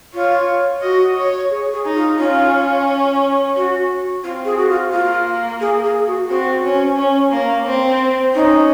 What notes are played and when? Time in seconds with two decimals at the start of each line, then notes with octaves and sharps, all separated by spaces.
0.14 F4 C#5
0.82 F#4 D#5
1.17 C#5
1.51 G#4
1.74 G#4
1.85 D#4
1.96 F4
2.19 C#4 F4
3.56 F#4
4.24 C4 F4
4.45 G#4
4.57 F#4
4.70 F4
4.92 A#3 F4
5.61 G#4
5.84 G#4
6.07 F#4
6.29 C4 F#4
6.64 C#4
6.98 C#4
7.32 A#3
7.66 C4
8.35 C#4 D#4